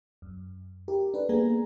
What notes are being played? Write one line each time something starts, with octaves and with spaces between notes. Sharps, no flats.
F#2
E4 G4 A#4
D4 A4 B4
A#3 B3 G#4 G#5 A#5